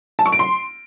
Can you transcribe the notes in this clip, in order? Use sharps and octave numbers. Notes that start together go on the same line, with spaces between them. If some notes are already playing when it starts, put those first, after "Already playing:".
A5
C#6
D7
C6